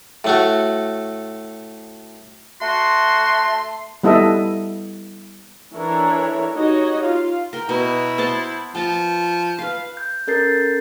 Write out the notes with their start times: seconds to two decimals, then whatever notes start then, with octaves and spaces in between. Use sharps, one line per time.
0.24 A2 A3 F#4
2.62 A3 F#4 C6
4.03 G3 B3 E4 A4 D#5 E5
5.75 E3 D4 E4 A4 A#4 C#5
6.53 D#4 F#4 G4 C#5 D#5
7.03 F4 F5
7.53 A#4 G5
7.69 B2 E4
8.18 B3 C5 A5
8.75 F3 G5 A5 A#5
9.59 B4 F5
9.97 G6
10.27 C#4 A4 A#4 G6 A6 C7